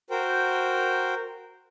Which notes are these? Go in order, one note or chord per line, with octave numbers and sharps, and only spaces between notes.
F#4 A#4 C5 G5